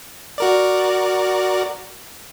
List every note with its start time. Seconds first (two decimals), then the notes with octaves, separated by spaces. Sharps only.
0.38 F#4 A#4 D5